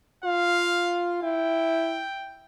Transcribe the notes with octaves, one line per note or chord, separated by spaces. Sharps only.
F4 F5
E4 G5